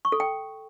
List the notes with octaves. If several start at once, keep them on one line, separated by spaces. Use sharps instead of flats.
C#6
A4
G5